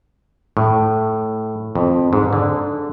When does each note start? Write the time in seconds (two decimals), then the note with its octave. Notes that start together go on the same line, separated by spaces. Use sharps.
0.57 A2
1.75 F2
2.13 G#2
2.33 D3